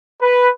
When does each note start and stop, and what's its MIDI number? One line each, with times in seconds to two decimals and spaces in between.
0.20 0.47 71